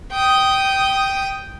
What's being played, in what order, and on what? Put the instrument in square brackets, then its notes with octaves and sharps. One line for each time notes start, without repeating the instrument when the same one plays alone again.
[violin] G5 D#6